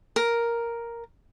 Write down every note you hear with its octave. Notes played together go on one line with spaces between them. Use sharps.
A#4